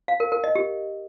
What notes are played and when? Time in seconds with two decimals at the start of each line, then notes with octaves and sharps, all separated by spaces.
0.08 F5
0.20 A#4
0.32 A#4
0.44 D#5
0.55 G4